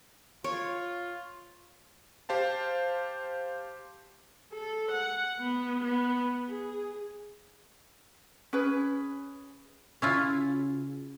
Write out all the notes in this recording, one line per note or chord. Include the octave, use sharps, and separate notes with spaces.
F4 C#5
G4 C5 F5 A5
A4
F#5
B3
B3
G#4
C#4 G#4 B4
C#3 C#4 E4 F4